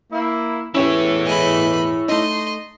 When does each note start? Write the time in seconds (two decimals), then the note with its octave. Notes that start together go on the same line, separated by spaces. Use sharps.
0.12 A#3 E4
0.75 E2 A2 E3 C#4 E4 G4 B4 C#5
1.26 G#4 D#5 B5
2.08 A3 D#4 D#5 C6